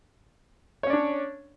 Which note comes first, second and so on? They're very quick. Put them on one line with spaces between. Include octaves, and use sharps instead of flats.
C#5 C#4 D5 D4